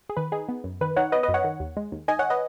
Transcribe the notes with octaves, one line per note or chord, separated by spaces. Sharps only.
G#4
D#3 B4
D#4 G#4
B3
F#2
D#3 B4
D#4 C#5 F#5
B3 B4 D#5
B4 D#5
F#2
C#5 F#5
D#3
D#2
G#3
D#2
D#3 D#5 G#5
C#5 F#5
B4 D#5